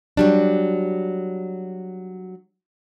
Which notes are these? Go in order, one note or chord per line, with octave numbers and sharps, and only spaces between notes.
F#3 G3 D4